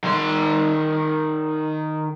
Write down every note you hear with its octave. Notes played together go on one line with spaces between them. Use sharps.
D#3 C6